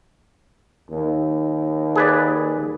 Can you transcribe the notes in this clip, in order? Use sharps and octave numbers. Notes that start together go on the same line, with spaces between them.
D#2
G#4 B4 D5